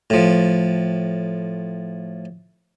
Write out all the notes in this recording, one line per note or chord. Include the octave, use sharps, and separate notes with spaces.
A2 F3